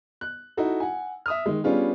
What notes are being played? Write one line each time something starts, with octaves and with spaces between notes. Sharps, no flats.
F#6
D#4 E4 F#4 A4
F#5 G#5
E5 D#6 F6
D#3 G#3
G3 B3 C#4 D4 F4 G#4